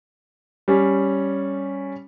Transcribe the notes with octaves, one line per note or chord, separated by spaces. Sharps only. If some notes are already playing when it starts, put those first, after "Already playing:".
G3 C#4